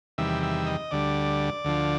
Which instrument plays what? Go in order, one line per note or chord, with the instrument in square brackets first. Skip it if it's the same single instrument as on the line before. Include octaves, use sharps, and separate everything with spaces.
[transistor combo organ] E2 C3 D#3 G3 E5
E5
D#5
D2 D3 G3 D5
D2 D3 F3